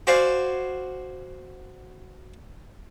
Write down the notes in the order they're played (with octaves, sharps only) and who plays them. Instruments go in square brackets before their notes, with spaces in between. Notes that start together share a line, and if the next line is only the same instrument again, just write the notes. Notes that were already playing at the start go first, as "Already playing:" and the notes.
[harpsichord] F#4 C5 D5 F5 G#5